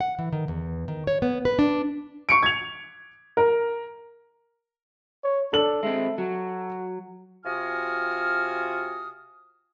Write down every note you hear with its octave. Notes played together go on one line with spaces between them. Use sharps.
F#5
E3
D#3
E2
D#3
C#5
B3
B4
D4
C#6 C#7 D7
G#6 F7
A#4
C#5
D4 A4 F#7
G#3 C4 E5
F#3 F#4
C3 F4 F#4 G#5 D#6 F6